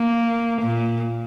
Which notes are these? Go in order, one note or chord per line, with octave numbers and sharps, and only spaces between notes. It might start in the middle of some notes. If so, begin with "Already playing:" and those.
Already playing: A#3
A#2